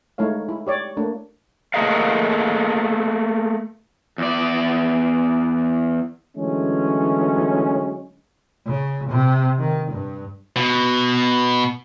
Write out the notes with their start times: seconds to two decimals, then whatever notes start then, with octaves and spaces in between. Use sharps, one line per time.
0.18 G#3 A3 D#4 E4 C#5 F5
0.49 E4
0.67 G4 C#5 D5
0.97 A3 A#3 D4
1.74 A3 A#3 G#4 A#4 D#5 F5
4.18 E2 D5
6.37 D3 E3 F#3 G#3 A3 C#4
8.67 C#3
9.10 C3
9.58 D#3
9.91 G2
10.56 B2